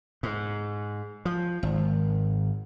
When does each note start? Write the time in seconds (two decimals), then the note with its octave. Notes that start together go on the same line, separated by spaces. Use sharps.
0.23 G#2
1.25 F3
1.63 G#1